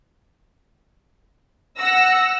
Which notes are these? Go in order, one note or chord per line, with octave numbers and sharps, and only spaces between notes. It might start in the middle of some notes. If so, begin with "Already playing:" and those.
F#5 E6 A#6